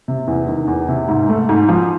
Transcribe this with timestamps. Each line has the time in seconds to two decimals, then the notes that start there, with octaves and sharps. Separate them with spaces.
0.08 C3
0.27 E2
0.49 D#3
0.68 E2
0.88 C3
1.09 G#2
1.29 A3
1.49 G#2
1.69 F3